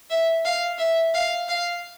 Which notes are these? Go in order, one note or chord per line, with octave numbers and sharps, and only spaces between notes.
E5
F5
E5
F5
F5